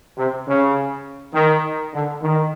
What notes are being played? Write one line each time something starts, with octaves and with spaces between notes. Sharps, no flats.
C3
C#3
D#3
D3
D#3